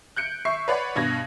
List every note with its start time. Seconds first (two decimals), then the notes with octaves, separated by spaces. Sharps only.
0.16 F#6 G6 C#7 D7
0.45 E5 C#6 C7
0.68 B4 C#5 D5 F#5 B5
0.96 G2 B2 G#6 A#6